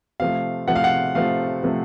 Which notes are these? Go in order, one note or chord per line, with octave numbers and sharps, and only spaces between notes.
C3 F3 A3 F5
C3 F3 A3 F#5
F5
F#5
C3 F3 A3 F5
C3 F3 A3